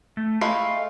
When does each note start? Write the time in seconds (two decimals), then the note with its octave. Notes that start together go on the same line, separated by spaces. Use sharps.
0.17 A3
0.41 G#3 A3 E4 F5